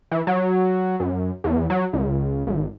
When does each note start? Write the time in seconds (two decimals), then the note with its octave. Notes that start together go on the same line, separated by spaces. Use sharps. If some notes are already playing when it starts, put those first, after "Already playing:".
0.11 E3
0.27 F#3
1.00 F#2
1.44 E2
1.70 F#3
1.93 C#2
2.47 G#1